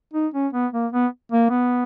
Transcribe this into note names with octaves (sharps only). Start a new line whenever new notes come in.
D#4
C#4
B3
A#3
B3
A#3
B3